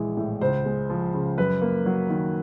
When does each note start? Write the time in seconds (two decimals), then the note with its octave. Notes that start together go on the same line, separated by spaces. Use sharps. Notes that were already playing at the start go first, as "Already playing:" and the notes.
Already playing: A#1 E3 G#3
0.17 A2
0.41 C#2 C5
0.65 G#3
0.90 F3
1.14 C#3
1.38 F#2 B4
1.62 A#3
1.86 F#3
2.10 D#3